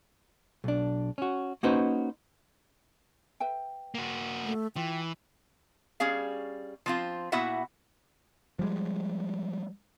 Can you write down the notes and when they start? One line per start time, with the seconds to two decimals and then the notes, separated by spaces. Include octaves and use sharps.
0.64 B1 D4
1.18 C#4 F#4
1.63 A#3 C#4 D#4 F#4 B4 C5
3.40 B4 E5 G5
3.95 A#3 F#4
4.44 A3
4.76 E3 F4 G5
6.00 G3 C#4 G#4 F5
6.86 F3 C4 F4
7.32 A#2 B3 E4 F#4 E5 F#5
8.59 F3 G3 G#3